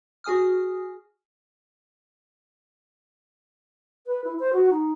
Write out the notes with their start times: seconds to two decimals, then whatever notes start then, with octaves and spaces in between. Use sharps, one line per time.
0.24 F#4 G#4 G#5 D#6 F6
4.07 B4
4.24 E4
4.39 C5
4.53 F#4
4.70 D#4